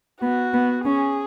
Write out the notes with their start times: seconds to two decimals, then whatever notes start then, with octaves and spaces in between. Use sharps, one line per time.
0.22 B3 F#4
0.54 B3
0.85 C#4 G#4